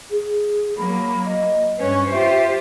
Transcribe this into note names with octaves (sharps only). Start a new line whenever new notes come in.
G#4
F#3 A#3 B5
D#5
G2 C#4 B4 C#5
F4 G4 C5 E5